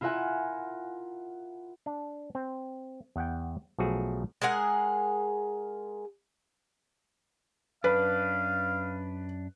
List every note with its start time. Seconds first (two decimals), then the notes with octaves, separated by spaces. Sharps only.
0.01 E4 F4 A#4 E5 F#5 G#5
1.86 D4
2.35 C4
3.16 E2 F#5 G5
3.78 B1 F3 A3 F#4 G#4
4.42 G#3 G#4 A#4 F#5
7.84 F#2 D4 B4 F5